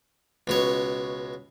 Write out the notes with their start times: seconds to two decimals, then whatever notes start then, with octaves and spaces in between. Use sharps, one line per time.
0.47 C#2 B2 C#5